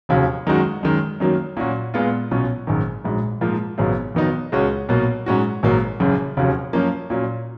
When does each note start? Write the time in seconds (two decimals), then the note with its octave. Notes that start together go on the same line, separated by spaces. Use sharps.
0.09 F1 D#2 C#3 F#3
0.47 F#2 D#3 G#3 D#4 F#4
0.83 F#2 D#3 G#3
1.20 F#2 D#3 F#3 A#3
1.57 A#2 F#3 C#4 F#4
1.94 A#2 G#3 B3 F4
2.31 B1 B2 F#3 C#4 F4
2.67 G#1 F#2 D#3
3.04 A#1 G#2 F#3
3.41 G#2 F3 A#3 F4
3.78 G#1 F#2 C#3 F#3 B3
4.15 F2 D#3 F#3 B3 D#4
4.52 C#2 C#3 G#3 C#4 F#4
4.89 B1 B2 A#3
5.26 G#2 F#3 C#4 F#4
5.63 G#1 G#2 F#3 A#3
6.00 F#1 F#2 C#3
6.37 F1 D#2 C#3 F#3
6.73 F#2 F3 A#3 C#4
7.10 A#2 F#3 C#4